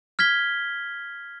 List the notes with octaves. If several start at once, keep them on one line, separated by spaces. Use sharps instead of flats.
F6 G#6 B6 G7